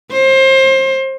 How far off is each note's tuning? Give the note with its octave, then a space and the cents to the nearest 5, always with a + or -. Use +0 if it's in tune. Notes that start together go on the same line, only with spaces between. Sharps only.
C5 +25